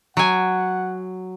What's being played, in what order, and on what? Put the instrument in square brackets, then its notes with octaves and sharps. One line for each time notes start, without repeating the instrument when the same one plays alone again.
[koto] F#3 G#5 [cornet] F#5